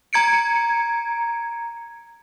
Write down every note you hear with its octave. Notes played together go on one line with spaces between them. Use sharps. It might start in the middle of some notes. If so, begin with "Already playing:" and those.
A#5 G#6 C#7 D7